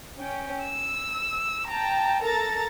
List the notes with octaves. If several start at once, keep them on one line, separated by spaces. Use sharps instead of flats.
C#4 G5
E6
G5 A5 A#5
A4 A#4 A#5 A6